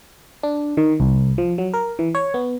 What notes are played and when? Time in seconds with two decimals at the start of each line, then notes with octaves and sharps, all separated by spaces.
0.43 D4
0.77 D#3
1.00 C2
1.38 F3
1.58 F#3
1.74 A#4
1.99 E3
2.15 C#5
2.34 B3